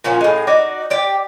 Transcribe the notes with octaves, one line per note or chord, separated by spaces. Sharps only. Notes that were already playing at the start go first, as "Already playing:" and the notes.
A#2 F3 C#4 F#4
A2 G#3
D#4 F#4 D5
G4 D5 G5